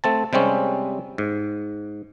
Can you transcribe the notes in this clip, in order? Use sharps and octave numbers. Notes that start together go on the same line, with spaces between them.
A3 C4 A5
C3 G3 G#3 C4 C#4
G#2